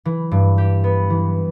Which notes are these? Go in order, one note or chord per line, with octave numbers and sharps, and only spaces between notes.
E3
G2
G4
B3
E3